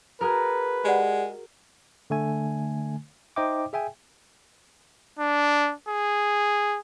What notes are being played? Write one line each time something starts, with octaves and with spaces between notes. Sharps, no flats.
F#4 G#4 A#4 B4
G#3 G4 D5 F#5
D3 A3 G#5
D#4 C5 D#5 E5 G5 D6
G#4 E5 G5 G#5
D4
G#4